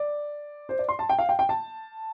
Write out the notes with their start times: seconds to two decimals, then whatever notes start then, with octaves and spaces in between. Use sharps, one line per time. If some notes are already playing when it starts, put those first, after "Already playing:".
Already playing: D5
0.69 C5
0.79 D5
0.89 C6
0.99 A5
1.09 G5
1.19 F5
1.29 G5
1.39 G5
1.49 A5